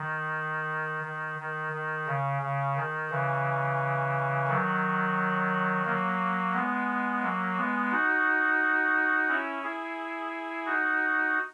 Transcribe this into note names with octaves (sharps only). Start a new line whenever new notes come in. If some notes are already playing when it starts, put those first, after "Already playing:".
Already playing: D#3
D#3
D#3
D#3
C#3
C#3
D#3
C#3 E3
D#3 F#3
F#3 A#3
G#3 B3
F#3 A#3
G#3 B3
D#4 F#4
C#4 E4
E4 G#4
D#4 F#4